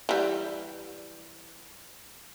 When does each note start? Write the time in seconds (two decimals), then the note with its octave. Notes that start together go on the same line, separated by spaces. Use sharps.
0.09 E3 G3